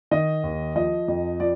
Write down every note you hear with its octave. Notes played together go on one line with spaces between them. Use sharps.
D#3 D#5
D#2
F3 D#5
F2
F3 D5